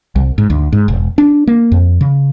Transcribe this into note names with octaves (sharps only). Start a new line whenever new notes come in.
C2
G#2
D2
G#2
E1
D4
A#3
F2
C#3